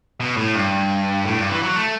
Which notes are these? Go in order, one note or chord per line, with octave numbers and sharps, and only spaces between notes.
B2
A2
G2
A2
G2
E3
F#3
A3